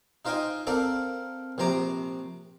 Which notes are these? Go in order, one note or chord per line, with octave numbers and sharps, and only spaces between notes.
D#4 F4 C5 D#5 G5 G#5
C4 A4 A#4 D5 F5
A#1 C3 C5 A#5 D6